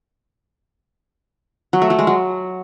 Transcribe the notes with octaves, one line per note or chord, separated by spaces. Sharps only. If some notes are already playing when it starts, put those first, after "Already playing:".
F#3
A3
F#3
G#3
F#3